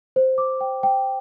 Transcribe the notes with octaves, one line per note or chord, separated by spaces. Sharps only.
C5
D6
G5
G5